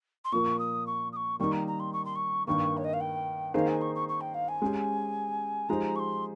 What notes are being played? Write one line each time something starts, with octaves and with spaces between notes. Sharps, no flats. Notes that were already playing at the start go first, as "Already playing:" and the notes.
C6
A#2 F3 A#3 F4 C#6
D#6
C#6
D#6
C#6
D#3 G3 A#3 D#4 C#6
A#5
A#5
C6
C#6
C6
C#6
G2 D#3 A#3 C#6
C#5
D#5
F5
G5
D#3 A#3 D#4 G#4 C5 F5
G#5
C#6
C#6
C#6
G5
F5
G#5
G#3 C#4 G4
F3 G#3 D#4 G4 C5 A#5
C#6
C6